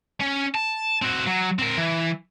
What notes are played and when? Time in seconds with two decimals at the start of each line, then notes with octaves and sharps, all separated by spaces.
0.21 C#4
0.55 A5
1.02 C4 F#4
1.27 F#3
1.59 C4 A#4
1.77 E3